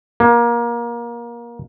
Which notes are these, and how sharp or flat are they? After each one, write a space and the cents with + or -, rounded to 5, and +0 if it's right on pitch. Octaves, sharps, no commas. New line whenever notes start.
A#3 +25